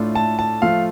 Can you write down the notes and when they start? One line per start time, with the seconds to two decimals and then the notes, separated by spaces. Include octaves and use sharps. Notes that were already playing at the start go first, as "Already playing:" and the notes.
Already playing: A2 A3 D4 F4 A4
0.15 A5
0.39 A5
0.62 F3 A3 F4 A4 F5